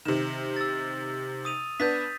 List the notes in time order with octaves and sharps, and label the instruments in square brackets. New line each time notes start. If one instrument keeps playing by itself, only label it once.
[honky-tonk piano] C3 D#3 [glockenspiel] E7
[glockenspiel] E6 A6
D#6 D#7 F7
[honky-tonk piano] B3 D4 [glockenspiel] G6 A6 B6